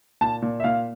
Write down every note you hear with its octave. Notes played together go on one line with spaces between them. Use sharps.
A#2 A5
A#2
E5
A#2 F5